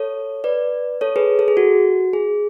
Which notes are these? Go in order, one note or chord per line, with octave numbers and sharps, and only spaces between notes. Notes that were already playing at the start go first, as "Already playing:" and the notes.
Already playing: A4 C#5
B4 D5
A4 C#5
G#4 B4
A4
G#4
F#4
G#4